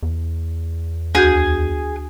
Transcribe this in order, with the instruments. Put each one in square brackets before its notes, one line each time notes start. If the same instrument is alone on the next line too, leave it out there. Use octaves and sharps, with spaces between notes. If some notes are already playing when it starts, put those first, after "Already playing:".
[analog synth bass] E2
[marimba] D2 F#4 G6 [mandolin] G#4